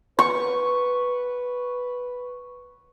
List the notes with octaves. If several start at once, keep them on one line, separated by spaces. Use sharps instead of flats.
B4 C#6